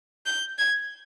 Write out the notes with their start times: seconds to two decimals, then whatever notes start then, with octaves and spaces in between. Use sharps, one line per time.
0.26 G6
0.58 G#6